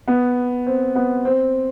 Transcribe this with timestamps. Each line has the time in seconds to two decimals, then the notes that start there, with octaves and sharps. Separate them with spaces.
0.08 B3
0.66 C4
0.96 B3
1.25 C4